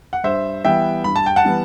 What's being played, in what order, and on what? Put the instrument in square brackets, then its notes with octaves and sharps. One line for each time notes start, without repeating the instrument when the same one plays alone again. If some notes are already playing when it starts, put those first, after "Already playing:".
[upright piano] F#5
G2 C5 E5
E3 G3 B3 E5 G5
G2 B5
A5
G5
F#5 A5
E3 G3 B3